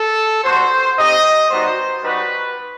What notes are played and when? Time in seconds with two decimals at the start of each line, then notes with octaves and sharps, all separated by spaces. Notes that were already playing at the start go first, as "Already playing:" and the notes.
Already playing: A4
0.43 G3 B3 F#4 C5
0.97 C4 D#4 G4 D#5
1.50 G3 B3 D#4 F#4 C5
2.03 G3 D#4 F#4 B4